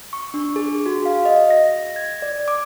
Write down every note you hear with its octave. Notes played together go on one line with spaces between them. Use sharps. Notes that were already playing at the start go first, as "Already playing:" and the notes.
C#6
D4
G#4
F#4
F5
D#5
A#6
G#6
D5
D6